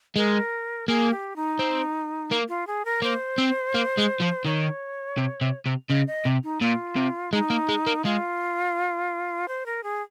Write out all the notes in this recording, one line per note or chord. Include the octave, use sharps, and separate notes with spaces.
G#3 A#4
A#3 G#4
G4
D#4
C4
A#3
F4
G#4
A#4
A#3 C5
C4
A#3
G#3
F3
D#3 C#5
C3
C3
C3
C#3 D#5
D#5
C3
D#4
A#2 F4
C3
G#3 D#4
A#3
G#3
A#3
G#3 F4
C5
A#4
G#4